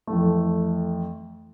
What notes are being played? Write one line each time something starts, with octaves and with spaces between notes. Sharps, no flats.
F2 E3 A3